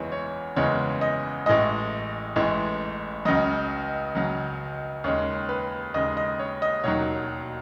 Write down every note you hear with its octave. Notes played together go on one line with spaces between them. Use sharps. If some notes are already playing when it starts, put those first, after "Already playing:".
Already playing: F#1 E2 C#3 E3 G#3 C#5
C#5
F#1 E2 C#3 E3 G#3 C#5
D#5
A1 A2 E3 G#3 D#5
A1 A2 E3 G#3
C#2 C#3 F#3 D#5
C#2 C#3 F#3
D#2 C#3 G#3 C#5
B4
D#2 C#3 G#3 D#5
D#5
C#5
D#5
E1 D#2 D#3 F#3 C#5